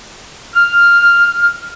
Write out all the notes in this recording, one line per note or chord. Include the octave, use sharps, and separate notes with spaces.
F6